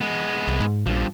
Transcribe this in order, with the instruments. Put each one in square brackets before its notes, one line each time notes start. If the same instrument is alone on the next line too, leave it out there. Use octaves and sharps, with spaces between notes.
[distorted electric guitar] G#3 B3
[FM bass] C2
G#2
[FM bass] A#1 [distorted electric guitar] G2 F3